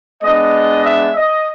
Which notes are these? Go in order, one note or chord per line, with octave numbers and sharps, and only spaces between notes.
G#3 B3 D4 D#5
E5
D#5